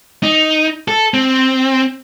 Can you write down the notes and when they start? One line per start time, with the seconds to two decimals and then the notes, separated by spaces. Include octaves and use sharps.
0.23 D#4
0.88 A4
1.14 C4